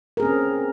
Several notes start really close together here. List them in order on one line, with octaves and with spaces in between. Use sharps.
A#4 G#4 C#4 C4